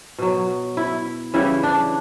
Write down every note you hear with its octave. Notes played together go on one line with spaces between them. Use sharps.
B2 F#3
E4
C#3 E3 G3 E4
D4